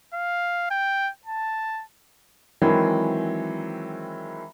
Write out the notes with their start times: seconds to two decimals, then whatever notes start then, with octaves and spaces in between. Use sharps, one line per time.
0.14 F5
0.71 G5
1.26 A5
2.62 D#3 E3 F#3 G#3 C4